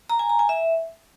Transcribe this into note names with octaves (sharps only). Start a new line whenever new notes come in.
A#5
G#5
A#5
G#5
E5